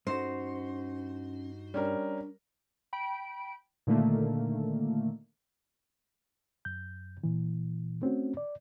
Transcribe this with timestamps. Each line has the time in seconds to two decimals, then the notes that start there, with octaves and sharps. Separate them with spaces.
0.07 G2 C#4 D#4 F#4 C5
1.74 G3 C#4 D4 A#4
2.93 G5 B5 D7
3.87 A#2 D3 D#3 A3 A#3
6.65 F#2 G6
7.24 A#2 E3
8.02 A3 C4 C#4 F#4
8.37 D5